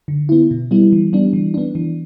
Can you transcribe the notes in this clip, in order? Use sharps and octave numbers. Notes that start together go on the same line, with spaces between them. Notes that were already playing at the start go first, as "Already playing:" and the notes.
D3
B3 E4
B2
G3 B3 E4
E3
G3 B3 D4
E3
B3 D4
E3